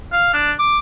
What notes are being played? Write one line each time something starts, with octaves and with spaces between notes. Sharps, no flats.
F5
D4
D6